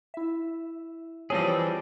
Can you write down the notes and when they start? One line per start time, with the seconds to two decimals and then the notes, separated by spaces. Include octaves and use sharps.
0.14 E4 E5
1.30 E3 F3 G3 C4 G#4 C#5 A5 A#6